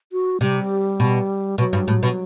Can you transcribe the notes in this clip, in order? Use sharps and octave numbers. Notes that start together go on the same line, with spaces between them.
F#4
C3 G3
B2
B2 F#3
G2
A2
B2